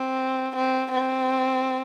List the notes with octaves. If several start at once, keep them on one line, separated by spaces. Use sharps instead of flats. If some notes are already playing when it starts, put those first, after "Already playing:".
Already playing: C4
C4
C4